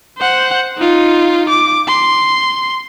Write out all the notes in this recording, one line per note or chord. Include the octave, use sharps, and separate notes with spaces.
C5 F#5
D#4 F4
D6
C6